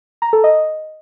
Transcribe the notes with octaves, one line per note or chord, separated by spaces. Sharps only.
A#5
A4
D#5